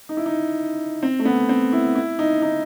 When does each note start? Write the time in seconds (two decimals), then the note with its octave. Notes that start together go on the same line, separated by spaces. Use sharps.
0.09 D#4
0.17 E4
0.26 D#4
1.03 C4
1.19 A3
1.25 B3
1.49 C4
1.73 E4
1.95 E4
2.19 D#4
2.42 D#4